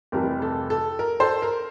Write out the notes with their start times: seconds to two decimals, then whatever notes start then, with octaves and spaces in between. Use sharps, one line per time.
0.12 F1 F2 C3 E3 G3 A#4
0.42 A4
0.70 A4
0.99 A#4
1.20 A4 C5
1.42 A#4